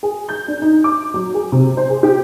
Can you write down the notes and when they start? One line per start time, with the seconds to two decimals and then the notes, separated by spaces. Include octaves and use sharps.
0.03 G#4
0.29 G6
0.48 D4
0.62 D#4
0.84 D6
1.14 F#3
1.34 G#4
1.52 C3
1.77 C5
1.90 G#4
2.03 G4